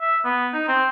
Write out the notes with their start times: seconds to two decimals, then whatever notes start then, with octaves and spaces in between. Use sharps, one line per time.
0.01 E5
0.25 B3
0.53 D#4
0.68 C4